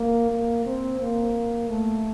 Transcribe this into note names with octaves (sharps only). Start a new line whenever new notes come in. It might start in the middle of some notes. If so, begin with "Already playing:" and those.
Already playing: A#3
A#3
C4
A#3
A3